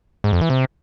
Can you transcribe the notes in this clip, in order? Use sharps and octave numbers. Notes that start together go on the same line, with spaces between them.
G#2
F2
E3
C3